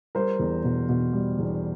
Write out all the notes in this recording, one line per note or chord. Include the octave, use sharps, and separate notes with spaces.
G3 A#4 C5
E2
B2
B2
G3
E2